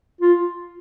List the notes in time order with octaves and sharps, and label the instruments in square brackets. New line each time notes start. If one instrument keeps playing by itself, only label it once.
[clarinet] F4